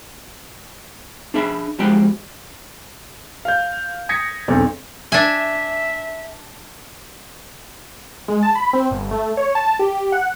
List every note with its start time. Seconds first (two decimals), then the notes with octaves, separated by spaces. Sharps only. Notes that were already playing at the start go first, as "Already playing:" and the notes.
1.34 D4 G#4 E5 A#5 B5
1.78 F2 F3 G#3 F#4 G4 G5
3.45 F5 G6
4.09 D#6 G#6 A#6 B6 C#7
4.48 E1 B1 D3 C4 D5
5.12 D4 E5 G#5
8.28 G#3
8.43 A5
8.55 B5
8.73 C4
8.91 G1
9.11 A3
9.37 C#5
9.55 A5
9.79 G4
10.12 F#5